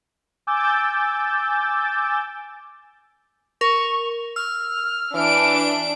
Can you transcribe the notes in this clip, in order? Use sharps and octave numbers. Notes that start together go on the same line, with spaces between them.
G#5 D6 E6 G6 A6
A#4 C#6
E6 F6
E3 D4 D7